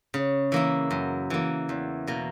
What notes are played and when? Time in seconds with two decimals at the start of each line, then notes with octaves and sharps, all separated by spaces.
0.14 C#3
0.52 E3 A#3 E4
0.91 F#2
1.30 E3 A#3
1.69 E2
2.07 B2 A#3